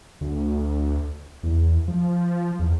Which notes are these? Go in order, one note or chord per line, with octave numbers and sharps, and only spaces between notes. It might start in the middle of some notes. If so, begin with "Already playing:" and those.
D2
E2
F3
E2